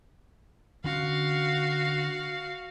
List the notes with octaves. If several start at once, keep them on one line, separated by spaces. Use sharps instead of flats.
D3 C#4 F#4 F5